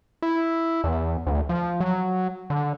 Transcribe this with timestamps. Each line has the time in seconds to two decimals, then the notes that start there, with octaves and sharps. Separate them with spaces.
0.22 E4
0.84 E2
1.27 D2
1.49 F3
1.80 F#3
2.50 D3